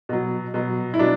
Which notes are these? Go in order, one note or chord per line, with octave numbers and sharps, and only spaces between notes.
B2 F#3
B2 F#3
E4
B2 F#3 D4